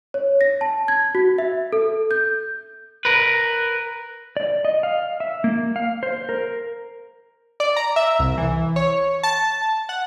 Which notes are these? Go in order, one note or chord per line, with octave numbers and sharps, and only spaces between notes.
C#5
A#6
A5
G#6
F#4
E5
A4
G6
A#4 B4
D5
D#5
F5
E5
A#3
F5
C5
A#4
D5
A#5
E5
C2
E3
C#5
A5
F#5